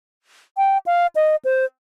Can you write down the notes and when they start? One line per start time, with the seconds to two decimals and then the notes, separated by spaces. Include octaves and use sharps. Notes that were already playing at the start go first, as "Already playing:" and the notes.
0.57 G5
0.86 F5
1.15 D#5
1.45 C5